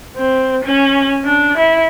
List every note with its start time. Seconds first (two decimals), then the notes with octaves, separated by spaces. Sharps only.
0.17 C4
0.64 C#4
1.25 D4
1.58 E4